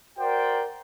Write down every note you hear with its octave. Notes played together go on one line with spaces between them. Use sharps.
F#4 A#4 C5 D5 G5